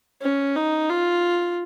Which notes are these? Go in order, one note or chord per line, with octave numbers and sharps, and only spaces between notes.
C#4
D#4
F4